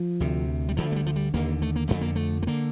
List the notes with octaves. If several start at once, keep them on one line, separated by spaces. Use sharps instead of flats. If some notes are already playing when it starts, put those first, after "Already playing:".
Already playing: F3
D2 C3
G3
D2 D3 F3
A3
G3
F3
G3
D#2 D3 A#3
A3
A#3
F2 D3 A3
A#3
A3
A3
D3 A#3